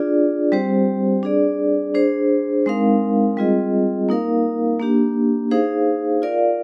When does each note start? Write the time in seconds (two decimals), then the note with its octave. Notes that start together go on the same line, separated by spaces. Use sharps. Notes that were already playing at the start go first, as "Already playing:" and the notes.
Already playing: D4 F4 G#4 D5
0.52 G3 C4 G4 C5
1.23 D4 G#4 D5
1.95 D4 G#4 C5
2.66 G#3 C4 D#4 A#4 F5
3.37 G3 C4 F4 G#4 D#5
4.09 A#3 D#4 A#4 F5
4.80 A#3 D4 G4
5.51 D#4 G#4 C5 F5
6.22 F4 A#4 D5 F5